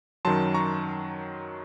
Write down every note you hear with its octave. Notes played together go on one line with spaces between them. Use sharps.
F#2 D#3 F#3 A5 C6
A#5 C#6